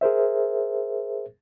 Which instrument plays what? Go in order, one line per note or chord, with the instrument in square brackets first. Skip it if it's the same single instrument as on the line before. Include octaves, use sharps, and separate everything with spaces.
[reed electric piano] G#4 A#4 C5 E5